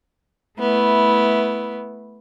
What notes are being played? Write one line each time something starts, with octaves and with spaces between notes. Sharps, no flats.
A3 B3 E4